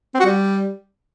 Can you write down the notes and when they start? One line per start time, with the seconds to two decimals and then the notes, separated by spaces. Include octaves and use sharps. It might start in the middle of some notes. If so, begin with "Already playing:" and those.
0.14 C4
0.20 F#4
0.25 G3